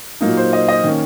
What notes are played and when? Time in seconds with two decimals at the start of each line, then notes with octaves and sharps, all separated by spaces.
0.21 A#2 F#3 A#3 D#4
0.37 C5
0.53 D#5
0.69 D#5
0.83 D#3 A#3 C#4